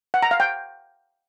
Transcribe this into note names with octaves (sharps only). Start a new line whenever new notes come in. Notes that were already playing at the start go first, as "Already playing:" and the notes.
F#5
A#5
F5
G5